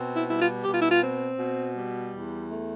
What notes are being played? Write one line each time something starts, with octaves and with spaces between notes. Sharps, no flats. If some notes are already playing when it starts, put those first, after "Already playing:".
Already playing: B2 C4
E4
G3 E4
F4
B2 G4
F4
E4
F4
C4
B2
G3
E2
A3